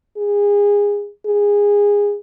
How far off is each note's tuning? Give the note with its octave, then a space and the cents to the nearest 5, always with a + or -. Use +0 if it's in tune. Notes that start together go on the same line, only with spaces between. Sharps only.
G#4 -25
G#4 -20